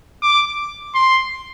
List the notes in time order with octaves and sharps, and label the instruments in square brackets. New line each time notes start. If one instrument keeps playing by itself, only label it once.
[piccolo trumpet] D6
C6